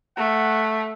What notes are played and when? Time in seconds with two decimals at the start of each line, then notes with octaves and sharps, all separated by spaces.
0.17 A3 F#5